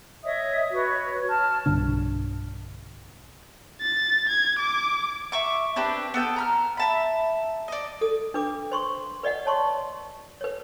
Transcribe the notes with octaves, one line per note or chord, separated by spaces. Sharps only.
C#5 D#5 E5 D#6
F#4 B4 C#5
A5 F6
B1 G2 D3 D4
A6
G#6
D6
E5 C#6 D6
C4 D4 G4 B4
B3 A4 G5
A#5 B5 F6
E5 A5 B5
D5 D#5
A4 D#6
D4 B4 D6
C5 C6 C#6
B4 D5 D#5 F#5
C#5 A5 C6 C#6
B4 C#5